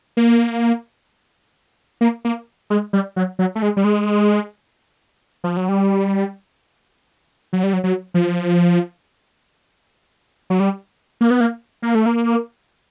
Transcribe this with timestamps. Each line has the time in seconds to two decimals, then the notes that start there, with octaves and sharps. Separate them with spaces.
0.17 A#3
2.01 A#3
2.25 A#3
2.70 G#3
2.93 G3
3.16 F#3
3.39 F#3
3.55 A3
3.62 G#3
3.77 G3
3.84 G#3
5.44 F3
5.57 F#3
5.69 G3
7.53 F#3
7.63 G3
7.73 F#3
7.84 F#3
8.14 F3
10.50 F#3
10.60 G3
11.21 A#3
11.31 B3
11.40 A#3
11.82 A#3
11.95 A3
12.06 A#3